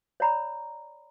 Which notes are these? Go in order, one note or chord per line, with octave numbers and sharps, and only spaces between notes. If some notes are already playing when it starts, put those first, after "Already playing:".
C#5 D5 A#5 B5